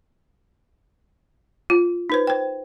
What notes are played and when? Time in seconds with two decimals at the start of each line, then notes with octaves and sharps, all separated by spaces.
1.70 F4
2.10 D#4 B4 C5
2.27 C5 G5